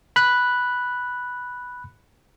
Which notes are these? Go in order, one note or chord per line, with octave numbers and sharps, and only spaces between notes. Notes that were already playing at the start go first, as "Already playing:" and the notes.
B5 F#6